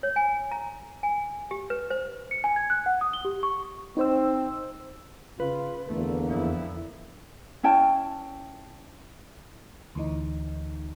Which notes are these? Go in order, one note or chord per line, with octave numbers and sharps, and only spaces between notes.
C#5
G#5
A#5
G#5
G4
B4
C5
C#7
G#5
G#6
F#6
F#5
D#6
G7
G4
C#6
C4 D#4 C5 E6
C#3 F4 B4
E2 D3 A3 A#3
F2 E4
C#4 E4 G5 A5
D2 E3 D#4